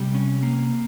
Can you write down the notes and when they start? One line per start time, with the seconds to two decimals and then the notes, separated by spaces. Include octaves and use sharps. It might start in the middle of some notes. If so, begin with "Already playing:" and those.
Already playing: C3 G3
0.14 C#4
0.43 A#3